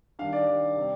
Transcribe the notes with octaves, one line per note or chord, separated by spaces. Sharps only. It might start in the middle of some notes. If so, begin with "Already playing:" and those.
D#3 G3 D4 F5
D5
D#3 G3 D4
C3 G3 C4